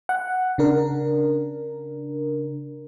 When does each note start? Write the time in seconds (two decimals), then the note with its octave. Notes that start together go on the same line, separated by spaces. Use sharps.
0.09 F#5
0.58 C#3 D4 A#4